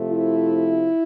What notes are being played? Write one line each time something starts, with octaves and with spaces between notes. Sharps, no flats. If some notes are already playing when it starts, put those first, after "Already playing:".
Already playing: C3 F3 A3
E4